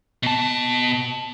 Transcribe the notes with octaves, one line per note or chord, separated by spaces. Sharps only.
B2 A5